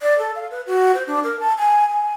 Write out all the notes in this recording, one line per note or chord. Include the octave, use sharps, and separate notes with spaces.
D5
A4
F5
B4
F#4
C5
D4
A#4
A5
G#5
G#5